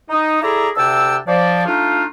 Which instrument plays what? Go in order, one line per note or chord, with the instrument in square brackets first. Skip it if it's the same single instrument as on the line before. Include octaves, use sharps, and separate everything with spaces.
[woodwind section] D#4
E4 G#4 A4 D5 A#5
D2 C3 G5 A5 E6
F3 D5
A3 D4 D#4 F4